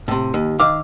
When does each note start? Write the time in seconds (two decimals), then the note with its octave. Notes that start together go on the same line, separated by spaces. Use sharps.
0.08 A2 C3
0.34 D#2
0.59 D#3 F5 D6 E6